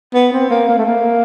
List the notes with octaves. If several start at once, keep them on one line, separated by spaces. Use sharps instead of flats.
B3
C4
A#3
A#3
A3
A#3